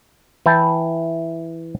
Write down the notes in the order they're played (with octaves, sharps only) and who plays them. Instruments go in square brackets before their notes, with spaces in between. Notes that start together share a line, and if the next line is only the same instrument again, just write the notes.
[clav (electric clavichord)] E3 E4 G5 A5